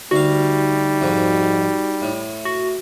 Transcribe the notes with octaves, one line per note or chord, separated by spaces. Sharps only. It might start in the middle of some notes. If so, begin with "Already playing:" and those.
D2 G3 D#4 F#4 F5
F2 G#2
A2
F#4